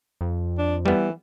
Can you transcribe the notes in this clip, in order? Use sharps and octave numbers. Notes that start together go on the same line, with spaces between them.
F2
D4
E3 G3 B3